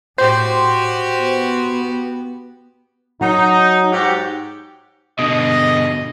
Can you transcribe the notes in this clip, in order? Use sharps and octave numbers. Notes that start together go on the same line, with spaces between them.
A2 F#4 G4 C5
B3
F#3 D#4
G#2 F#4 G4
B2 D3 D#5